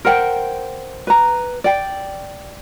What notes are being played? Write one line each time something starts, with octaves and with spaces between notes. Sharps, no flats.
A#4 C5 F#5 G5
B4 A#5
D5 G5